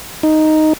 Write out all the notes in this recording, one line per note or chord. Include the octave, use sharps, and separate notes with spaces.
D#4